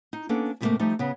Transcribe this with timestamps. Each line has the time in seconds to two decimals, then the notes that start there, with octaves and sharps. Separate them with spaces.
0.13 D#4
0.29 A#3 B3 C#4 D4 A4
0.61 G#2 C3 F3 G3 A3 A#3
0.79 F3 G3 A3 D#4 G4
0.99 C#3 B3